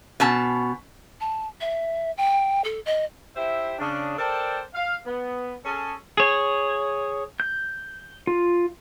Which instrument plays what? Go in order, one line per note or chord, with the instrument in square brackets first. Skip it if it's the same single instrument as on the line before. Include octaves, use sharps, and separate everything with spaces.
[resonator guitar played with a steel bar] B2 C#4 A5
[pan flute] A5
E5
G5
A4
D#5
[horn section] E4 G4 C5 E5
C#3 D4
A4 A#4 C5 D5 G5 A5
F5
B3
C#4 G#4 A4
[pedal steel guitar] G#4 C#5
G6
F4